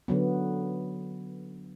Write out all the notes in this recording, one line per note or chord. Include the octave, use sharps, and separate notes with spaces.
D3 F#3 B3